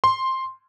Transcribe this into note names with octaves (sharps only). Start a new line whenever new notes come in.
C6